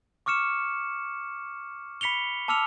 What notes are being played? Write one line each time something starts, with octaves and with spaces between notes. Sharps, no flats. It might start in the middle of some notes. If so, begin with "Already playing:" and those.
C#6 D6 F6 C#7 E7
B5 B6 C#7 F7 G7
A5 D6 E6 F6 C#7 F7